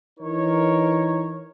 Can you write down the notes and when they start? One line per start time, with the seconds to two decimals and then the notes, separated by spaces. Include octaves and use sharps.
0.19 E3 D#4 A#4 C#5